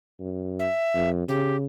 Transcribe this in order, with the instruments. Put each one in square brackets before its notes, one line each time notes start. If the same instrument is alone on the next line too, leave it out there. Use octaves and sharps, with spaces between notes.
[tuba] F#2
[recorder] E5
[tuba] F2
[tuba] C#3 [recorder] G4